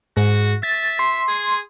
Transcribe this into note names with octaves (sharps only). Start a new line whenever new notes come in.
G#2 F#4
E5 A6
C6
G#4